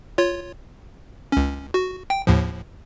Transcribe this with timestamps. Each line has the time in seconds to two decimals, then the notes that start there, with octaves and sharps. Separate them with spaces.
0.18 F4 C#5
1.32 C#2 C#4
1.74 F#4
2.10 G5
2.27 D#2 A2 F3